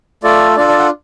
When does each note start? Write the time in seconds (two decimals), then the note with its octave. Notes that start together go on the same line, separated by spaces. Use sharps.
0.23 A3 F4 A4 D5
0.57 D4 F4 A4 D5
0.68 D5
0.79 F#5